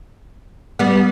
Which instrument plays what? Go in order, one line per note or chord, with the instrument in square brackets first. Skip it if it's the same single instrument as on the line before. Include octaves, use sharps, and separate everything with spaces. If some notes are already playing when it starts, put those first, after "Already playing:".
[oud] G3 B3